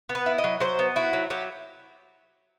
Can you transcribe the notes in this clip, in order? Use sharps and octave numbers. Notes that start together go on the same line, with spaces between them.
B3
B4
E4
D#5
F#3
F#3 C5
B3
E4 F#4
F#3
F#3 G4